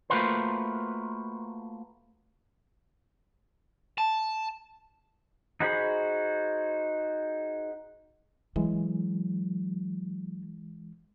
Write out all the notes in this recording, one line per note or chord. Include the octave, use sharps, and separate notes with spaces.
A3 A#3 F4 F#4 B4 C5
A5
D#4 F#4 G#4 C5 B5
E3 F#3 G#3